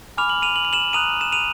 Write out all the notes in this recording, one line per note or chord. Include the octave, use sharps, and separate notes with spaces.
G#5 B5 D6 F6 F7
F#7
D#7 F7
F#7
F7
E7 F#7
A#5 D#6 F#6 D#7 F7
E7
D#7 F7